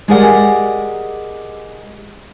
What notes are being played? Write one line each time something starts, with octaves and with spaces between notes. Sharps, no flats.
G#3 G4 G#4 A#4 D5 F#5